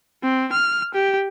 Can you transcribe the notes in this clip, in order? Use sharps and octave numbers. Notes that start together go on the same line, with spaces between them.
C4
F6
G4